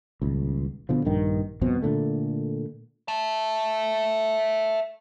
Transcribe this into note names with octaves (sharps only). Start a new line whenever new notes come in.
D#1 C#2
B2 D3 F3
A#1 G2 D#3
D#1 F2 B2 C4
A#2 D3 A3
E5 A5